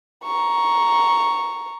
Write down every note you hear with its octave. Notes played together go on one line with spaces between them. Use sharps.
A#5 C#6